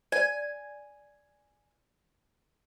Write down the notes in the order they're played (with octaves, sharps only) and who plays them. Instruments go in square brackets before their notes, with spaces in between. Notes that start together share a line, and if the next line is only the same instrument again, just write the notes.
[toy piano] D5 [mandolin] G#5